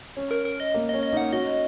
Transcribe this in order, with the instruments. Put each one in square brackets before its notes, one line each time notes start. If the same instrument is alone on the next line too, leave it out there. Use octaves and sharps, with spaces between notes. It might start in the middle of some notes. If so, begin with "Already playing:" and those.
[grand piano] C#4
[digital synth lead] A#4
A#4
D#5
[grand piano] A#3
[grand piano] C#4 [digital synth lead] D#5
[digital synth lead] D#5
[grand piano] A#3 D#4
[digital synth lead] F#5
[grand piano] C#4 F#4 [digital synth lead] D#5